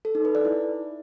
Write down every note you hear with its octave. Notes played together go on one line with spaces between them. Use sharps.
A4
D#4
B4
D5
E4